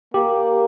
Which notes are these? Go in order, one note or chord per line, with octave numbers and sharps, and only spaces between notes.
A#3 G4